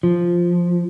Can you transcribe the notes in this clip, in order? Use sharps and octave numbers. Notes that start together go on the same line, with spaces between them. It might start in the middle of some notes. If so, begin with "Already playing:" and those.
F3